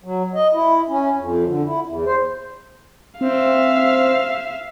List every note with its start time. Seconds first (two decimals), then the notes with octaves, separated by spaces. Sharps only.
0.04 F#3
0.35 D#5
0.54 E4
0.89 C#4
1.18 F2
1.47 D3
1.65 E4
1.85 E2
2.07 C5
3.21 C4 E5 F5